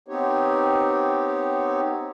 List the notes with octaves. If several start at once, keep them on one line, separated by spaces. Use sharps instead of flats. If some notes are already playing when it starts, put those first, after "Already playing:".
B3 C4 D#4 G4 C#5